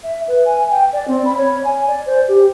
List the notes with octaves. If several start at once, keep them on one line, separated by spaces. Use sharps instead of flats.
E5
B4
G#5
G5
D5
C4
B5
C#5
G#5
D5
C5
G4